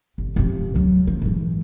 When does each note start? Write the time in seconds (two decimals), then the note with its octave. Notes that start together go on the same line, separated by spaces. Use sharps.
0.18 G1
0.36 C3 F3
0.74 D2 F#3
1.07 F3
1.22 G#2 E3